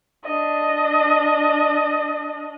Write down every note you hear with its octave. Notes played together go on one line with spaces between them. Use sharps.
D4 D#5